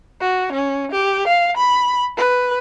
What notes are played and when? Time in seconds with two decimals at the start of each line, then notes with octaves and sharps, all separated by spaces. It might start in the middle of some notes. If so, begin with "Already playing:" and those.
0.21 F#4
0.53 C#4
0.92 G4
1.28 F5
1.58 B5
2.18 B4